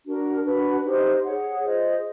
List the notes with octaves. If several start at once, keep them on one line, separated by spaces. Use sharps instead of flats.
D4 F#4 A#4
D4 F#4 B4
D#4 G4 C5 D#5
G#4 C#5 F#5
F4 G#4 C5 D#5